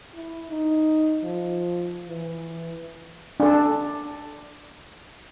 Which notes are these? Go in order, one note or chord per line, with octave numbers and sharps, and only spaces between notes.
E4
D#4
F3
E3
D4 A4